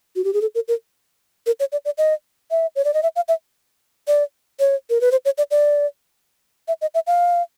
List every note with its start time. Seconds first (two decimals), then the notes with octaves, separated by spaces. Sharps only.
0.16 F#4
0.24 G4
0.33 G#4
0.41 A4
0.55 A#4
0.68 A#4
1.46 A#4
1.60 C#5
1.72 D5
1.85 D5
1.98 D#5
2.51 E5
2.76 C#5
2.85 D5
2.94 D#5
3.03 E5
3.16 F5
3.28 E5
4.08 D5
4.60 C#5
4.90 A#4
5.01 B4
5.12 C5
5.25 C#5
5.38 D5
5.51 D5
6.68 E5
6.81 D#5
6.94 E5
7.07 F5